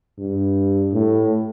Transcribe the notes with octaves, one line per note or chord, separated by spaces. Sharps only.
G2
A2